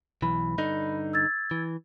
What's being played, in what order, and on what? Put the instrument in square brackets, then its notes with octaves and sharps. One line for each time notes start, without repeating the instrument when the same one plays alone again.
[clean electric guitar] B1 E3 [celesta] B5
[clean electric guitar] G2 D3 D#4
[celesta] E6 G#6 A6
[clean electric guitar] E3